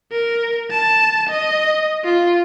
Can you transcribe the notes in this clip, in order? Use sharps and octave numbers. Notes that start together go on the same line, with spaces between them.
A#4
A5
D#5
F4